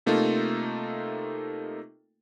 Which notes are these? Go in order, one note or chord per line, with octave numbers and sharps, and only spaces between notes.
C3 A3 A#3 D#4 F4 A4